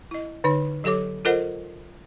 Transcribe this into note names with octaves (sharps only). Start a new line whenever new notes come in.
E4 D#5
D3 D#4 C#5
F#3 G4 A4 C#5 D6
F4 A4 A#4 C5 D#5 F#5